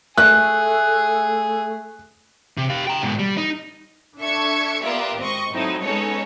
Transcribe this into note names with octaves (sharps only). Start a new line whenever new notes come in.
A3 G#4 A4 F#6
C3
G4 F5
G5 A#5
G#2 B2
G3
D#4
D4 A4 E5 C#6 G#6 C#7
B3 F4 G4 A#4 D5 E5
G#1 C4 D#5 C#6
F#3 A3 C4 D#4 E4
G#3 B3 C#4 D#4 A4 C#5